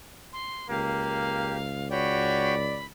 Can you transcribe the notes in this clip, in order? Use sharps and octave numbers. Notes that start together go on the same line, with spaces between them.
C6
C#2 A#3 G4 F5
F#4 C#5 D5 G5 B5